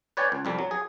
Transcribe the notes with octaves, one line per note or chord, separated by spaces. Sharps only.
B4 C#5 D5 G5 G#5
C#2
C2 F2 G3
F#3
G#4